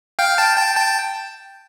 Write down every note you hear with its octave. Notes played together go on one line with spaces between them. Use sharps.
F5 G5
G5 A5
G5 A5
G5 A5